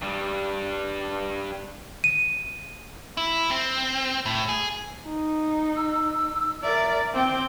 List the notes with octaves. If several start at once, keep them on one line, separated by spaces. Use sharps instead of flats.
G2 G3
D#7
E4
C4
A2
G#4
D#4
E6
A#4 D5 E5
C4 G5 D6